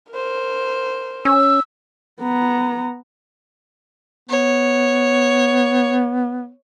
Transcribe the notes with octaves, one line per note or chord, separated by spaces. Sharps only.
A#4 C5
C#4 E6
B3 A#5
B3 C#5